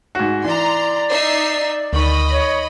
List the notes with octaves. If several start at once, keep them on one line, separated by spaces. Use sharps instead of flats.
G#2 F#4
E3 D5 A#5 C6
D#4 E5 C7
D2 D#3 D#5 B5 C#6
C#5